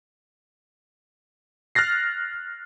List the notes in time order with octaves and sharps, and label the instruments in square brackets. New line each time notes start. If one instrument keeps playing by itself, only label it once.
[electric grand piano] F6 F#6 A6 A#6 C7